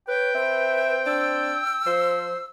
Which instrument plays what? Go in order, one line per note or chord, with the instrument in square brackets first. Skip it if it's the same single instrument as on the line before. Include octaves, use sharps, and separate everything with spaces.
[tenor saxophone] B4 [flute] C#5 [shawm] G5
[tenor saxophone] C4 [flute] B4 [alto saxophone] E5
[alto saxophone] D4 [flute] E6
[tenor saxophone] F3 [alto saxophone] C5